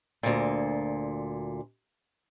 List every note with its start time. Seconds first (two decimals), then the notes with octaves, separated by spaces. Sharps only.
0.23 D2 A#2